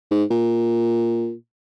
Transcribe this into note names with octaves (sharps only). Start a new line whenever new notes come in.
G#2
A#2